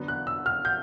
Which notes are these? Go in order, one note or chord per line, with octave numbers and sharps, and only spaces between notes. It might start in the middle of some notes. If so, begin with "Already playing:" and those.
Already playing: D3 F#3 B3
F#6
E6
F6
G6